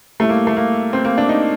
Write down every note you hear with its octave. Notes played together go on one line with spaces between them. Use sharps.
A2 G3 A3
A#3
A3
A#3
C4
A#3
D4
D#4